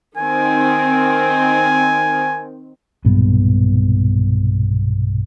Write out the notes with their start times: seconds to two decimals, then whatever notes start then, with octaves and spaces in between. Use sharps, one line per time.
0.17 D#3 C4 G#5
3.05 B1 G2 A#2 B3